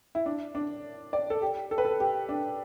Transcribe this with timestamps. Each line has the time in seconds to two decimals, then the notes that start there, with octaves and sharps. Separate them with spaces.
0.15 E4
0.26 D4
0.55 D4
1.13 D5
1.30 A4
1.42 G4
1.71 A4
1.78 B4
1.85 A4
2.00 G4
2.29 D4